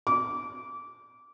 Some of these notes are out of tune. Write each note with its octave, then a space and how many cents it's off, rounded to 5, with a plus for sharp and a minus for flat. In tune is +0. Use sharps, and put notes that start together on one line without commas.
D6 -20